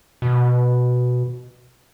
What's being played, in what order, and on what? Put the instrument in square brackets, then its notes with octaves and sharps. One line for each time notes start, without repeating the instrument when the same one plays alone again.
[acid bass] B2